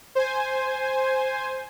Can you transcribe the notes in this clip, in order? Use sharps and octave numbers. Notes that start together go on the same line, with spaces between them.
C5 G#5